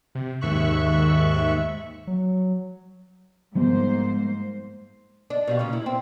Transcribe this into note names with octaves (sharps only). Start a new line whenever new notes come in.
C3
D#2 G#2 E5 C#6 F#6
F#3
G#2 F3 G3 A#3 B3 C5
D4
B2 G3 F5
A#2 C#3 C#4
E4
C4